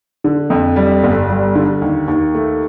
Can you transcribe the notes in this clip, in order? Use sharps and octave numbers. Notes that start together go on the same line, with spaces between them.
D3
F2
G3
G1
G3
D3
D#2
D#2
A3